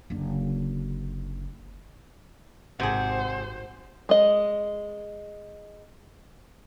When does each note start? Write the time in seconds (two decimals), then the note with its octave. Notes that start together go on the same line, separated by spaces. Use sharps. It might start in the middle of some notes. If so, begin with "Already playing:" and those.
0.10 F#1 D3
2.80 G#1 C3 G#4 C5 F#5
4.09 G#3 D#5